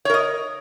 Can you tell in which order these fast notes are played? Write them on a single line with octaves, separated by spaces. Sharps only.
C#5 A#4 D#5